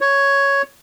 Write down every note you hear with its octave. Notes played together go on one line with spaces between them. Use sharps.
C#5